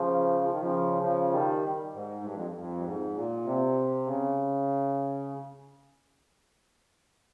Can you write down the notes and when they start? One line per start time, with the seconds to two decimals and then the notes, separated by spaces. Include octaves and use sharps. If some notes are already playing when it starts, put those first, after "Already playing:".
Already playing: C#3 F3
0.41 F3
0.51 D#3
0.61 C#3 F3
1.02 C#3 F3
1.32 D#3 G3
1.94 G#2
2.24 G2
2.35 F2
2.58 F2
2.77 G2
2.84 G#2
3.14 A#2
3.45 C3
4.06 C#3